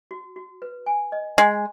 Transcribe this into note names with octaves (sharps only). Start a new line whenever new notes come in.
F#4
F#4
B4
G#5
D#5
G#3 G#5